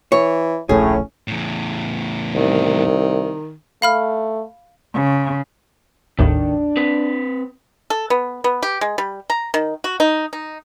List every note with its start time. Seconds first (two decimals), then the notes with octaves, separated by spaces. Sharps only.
0.12 E3 C#5
0.69 D1 A#1 A2 A3 C#4 G#4
1.28 E2 A2
2.35 C2 D#3
3.82 A3 F5 B5 F6
4.94 C#3
6.18 G#1 D#2 A2 D#3 D4
6.77 C4 B4
7.90 A4
8.10 B3
8.44 B3
8.63 G4
8.81 G#3
8.98 G3
9.30 A#5
9.54 D#3
9.84 F#4
10.00 D#4
10.33 D#4